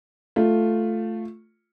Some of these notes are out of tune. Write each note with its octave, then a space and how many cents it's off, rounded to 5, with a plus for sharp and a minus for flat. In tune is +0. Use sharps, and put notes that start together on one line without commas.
A3 +0 F4 +0